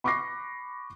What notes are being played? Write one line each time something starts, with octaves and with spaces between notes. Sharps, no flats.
B5 C#6 D6 F#6 A#6 C7